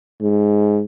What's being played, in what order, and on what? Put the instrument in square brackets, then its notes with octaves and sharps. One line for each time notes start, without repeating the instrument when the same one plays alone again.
[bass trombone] G#2